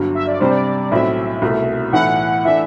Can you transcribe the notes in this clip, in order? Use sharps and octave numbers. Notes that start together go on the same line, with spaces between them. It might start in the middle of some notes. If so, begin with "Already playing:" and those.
Already playing: G1 G2 F#3
E5
D5
C3 G3 D4 C5
D5
B1 A2 F#3 C4 E4 E5
C2 B2 A3
B1 A2 E3 A3 E4 F#5
E3 A3 D4 E5